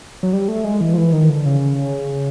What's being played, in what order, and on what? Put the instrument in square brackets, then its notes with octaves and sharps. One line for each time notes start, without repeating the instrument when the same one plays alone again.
[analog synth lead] F#3
G3
A3
G#3
E3
F3
E3
D#3
D3
C#3